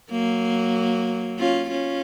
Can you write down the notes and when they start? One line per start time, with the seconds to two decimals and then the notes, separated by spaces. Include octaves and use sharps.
0.11 F#3 A#3
1.38 C#4 F4
1.71 C#4 F4